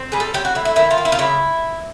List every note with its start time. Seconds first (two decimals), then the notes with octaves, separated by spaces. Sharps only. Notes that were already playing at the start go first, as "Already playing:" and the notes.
Already playing: C4
0.12 G3 G#4
0.20 A4
0.34 F#3 G4
0.45 F#4
0.55 A2 E4
0.65 E4
0.76 D#3 E4
0.91 F4
0.98 A#3
1.05 E4
1.12 F4
1.19 C#3 E4